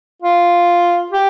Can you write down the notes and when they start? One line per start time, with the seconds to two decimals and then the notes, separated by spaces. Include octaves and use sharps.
0.22 F4
1.11 G4